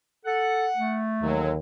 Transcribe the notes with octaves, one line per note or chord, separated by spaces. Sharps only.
A4 F#5
A3
D#2 D3 F#3